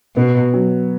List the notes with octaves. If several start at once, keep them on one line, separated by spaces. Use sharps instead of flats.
B2 B3
F#3